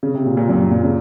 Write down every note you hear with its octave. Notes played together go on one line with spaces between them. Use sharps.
C#3
C3
A#2
A#2
F#2
A#2
C#3